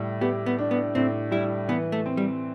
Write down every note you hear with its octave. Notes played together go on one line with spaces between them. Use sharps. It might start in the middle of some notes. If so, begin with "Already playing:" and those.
Already playing: A2 G3
B3 G4
B3
D4
B3
A2 C4
G3 E4
E3 B3
A3
C4
G3